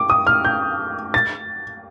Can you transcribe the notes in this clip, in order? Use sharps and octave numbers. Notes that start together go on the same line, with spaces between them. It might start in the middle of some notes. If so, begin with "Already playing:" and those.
Already playing: D6
D#6
F6
G6
A6